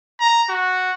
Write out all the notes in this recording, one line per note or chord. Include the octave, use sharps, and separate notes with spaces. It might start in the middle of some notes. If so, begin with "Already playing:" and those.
A#5
F#4